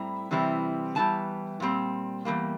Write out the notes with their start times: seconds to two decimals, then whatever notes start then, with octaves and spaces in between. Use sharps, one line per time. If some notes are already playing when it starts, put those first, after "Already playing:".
Already playing: A2 G3 C4 E4 A#5
0.31 C3 E3 G3 C4 E4
0.95 E2 E3 G3 A5
1.60 A#2 G3 C4
2.25 E2 C3 G3 A#3